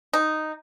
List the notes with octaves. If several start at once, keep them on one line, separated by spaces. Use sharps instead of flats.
D#4